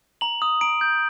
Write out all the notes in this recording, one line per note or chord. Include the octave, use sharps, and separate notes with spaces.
A#5 F#7
D#6
A#5 D7
G6